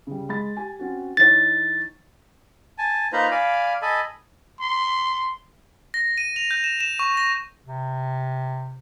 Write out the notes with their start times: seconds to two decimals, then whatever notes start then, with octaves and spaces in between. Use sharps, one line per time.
0.07 C#3 G3
0.29 G#3 B5 A6
0.57 G4 G#5
0.79 C4 C#4 F#4
1.17 E3 D#4 C#5 A6
2.78 G#5 A5
3.13 A#3 D#4 F4 B4 C5 A#5
3.31 D5 F5 G#5 B5
3.82 A4 D#5 G#5 A5 B5
4.61 C6
5.94 A#6
6.18 D#7
6.36 F7
6.51 G6
6.64 E7
6.81 E7
6.99 C#6
7.17 A#6
7.66 C3